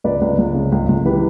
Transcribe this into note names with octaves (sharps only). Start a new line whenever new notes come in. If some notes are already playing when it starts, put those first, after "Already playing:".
C#2 B4 D5
C#2
C#2
C#3
C#2
C#2
E3 G4 B4